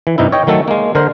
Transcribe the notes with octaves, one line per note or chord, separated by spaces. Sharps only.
E3
G2 C3 D#4 E4
C#5 D#5 G5
D#3 F#3 A3 A4
G#3 A#3
D3 A#4 C5